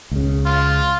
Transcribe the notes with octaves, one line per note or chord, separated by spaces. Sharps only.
C#2 C#3
F4